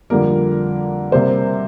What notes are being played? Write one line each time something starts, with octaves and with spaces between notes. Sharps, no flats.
F2 D3 G3 A#3 A#4
C3 G3 A#3 C5